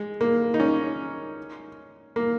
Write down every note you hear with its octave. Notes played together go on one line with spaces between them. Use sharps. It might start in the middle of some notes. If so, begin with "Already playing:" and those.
Already playing: G#3
A#3
D#4
C#4
A#3